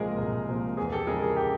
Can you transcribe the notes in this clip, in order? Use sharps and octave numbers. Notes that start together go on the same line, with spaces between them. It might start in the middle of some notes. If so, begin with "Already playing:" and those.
Already playing: C2 A#2 F3 G#3 G#4 A#4
C2
A#2 F3 G#3
E2 G#4
G4 A4
C#3 F3 G#3 G#4 A#4
G#4
G4